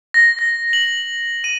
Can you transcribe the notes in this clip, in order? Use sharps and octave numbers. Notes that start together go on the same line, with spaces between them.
A#6
A#6
F#7
D#7